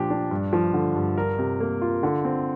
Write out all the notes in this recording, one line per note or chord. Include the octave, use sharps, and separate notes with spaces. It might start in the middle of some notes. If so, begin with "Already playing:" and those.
Already playing: A#2 F3 D4 G4
D4
G2
F3
D3
G2
A#4
C3
A#3
F4
D3
C4